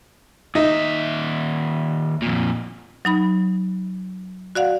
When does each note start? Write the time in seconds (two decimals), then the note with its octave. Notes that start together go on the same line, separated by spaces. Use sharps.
0.55 D#2 D#4 E5
2.22 F2 A#2
3.05 F#3 D#4 B5
4.55 F#4 D5 F5 F#5